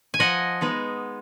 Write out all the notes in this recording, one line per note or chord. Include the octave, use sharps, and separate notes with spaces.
G#5
F3 D#5 F#5
G#3 B3 D#4